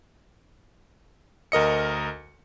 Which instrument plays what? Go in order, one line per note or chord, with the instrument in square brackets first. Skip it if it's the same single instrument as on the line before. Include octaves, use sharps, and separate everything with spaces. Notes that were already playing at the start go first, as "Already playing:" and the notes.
[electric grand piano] D2 A#4 D#5 C#7